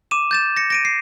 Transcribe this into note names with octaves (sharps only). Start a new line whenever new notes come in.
D6 D#7 E7
G6 A6 E7
A#6 C#7
A#6 D7 D#7
C7